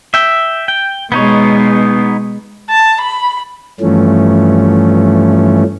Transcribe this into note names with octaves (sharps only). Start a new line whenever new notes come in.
E5 G5
G5
B2 G#3 B3 D#4 C#5
A5
B5
G2 E3 F3 A3 C#4